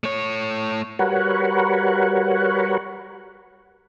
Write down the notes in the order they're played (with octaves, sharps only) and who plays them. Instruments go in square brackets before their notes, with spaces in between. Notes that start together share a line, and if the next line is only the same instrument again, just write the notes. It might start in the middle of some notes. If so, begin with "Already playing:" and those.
[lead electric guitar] A3 C#5
[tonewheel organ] G3 F#4 A#4 B4 C#5 F#5